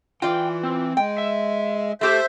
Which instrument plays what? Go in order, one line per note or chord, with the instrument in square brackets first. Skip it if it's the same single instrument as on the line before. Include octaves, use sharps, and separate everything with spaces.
[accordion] E3 [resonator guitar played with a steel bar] F4 D5 [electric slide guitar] G5
[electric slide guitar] C4
[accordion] G#3 [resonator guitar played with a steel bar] G5
[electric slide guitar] E5
[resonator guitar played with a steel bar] A3 G4 A4 [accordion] C5 E5